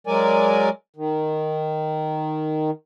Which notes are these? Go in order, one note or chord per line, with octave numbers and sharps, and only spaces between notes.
F#3 G#3 A#4 D5 G#5
D#3